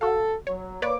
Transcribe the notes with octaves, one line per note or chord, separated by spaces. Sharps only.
F#4 A4 F5
F#3 C#5
A#3 B4 C#5 D5 D6